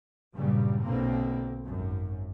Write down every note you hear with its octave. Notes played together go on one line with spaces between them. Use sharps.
G2 A#2 C#3 F#3 G3
B1 B2 D3 A#3 C4
G#1 F#2